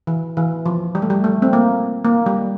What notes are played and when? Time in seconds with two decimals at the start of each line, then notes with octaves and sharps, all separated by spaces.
0.07 E3
0.37 E3
0.66 F3
0.95 G3
1.02 A3
1.10 G3
1.24 A3
1.42 C4
1.53 A#3
2.05 A#3
2.26 G3